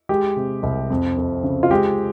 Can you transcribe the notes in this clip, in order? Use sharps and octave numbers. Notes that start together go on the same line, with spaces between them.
G#3 G4
C3
C2
F2
F2
C#3
F4
G#3 G4